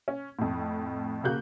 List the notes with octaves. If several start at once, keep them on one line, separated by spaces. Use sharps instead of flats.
C#4
F2 A2
C#3 A#3 F#4 F#6 G6